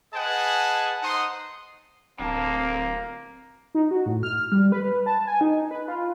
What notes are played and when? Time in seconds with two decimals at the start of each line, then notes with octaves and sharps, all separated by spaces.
0.14 G#4 B4 D#5 F#5 G#5 A5
1.03 D#4 C5 F#5 C6 D#6
2.19 D1 A#3 C4 A5
3.75 D#4
3.91 F#4
4.06 A2
4.23 F6
4.52 G3
4.72 B4
5.06 A5
5.27 G#5
5.41 D#4
5.71 B4
5.88 F4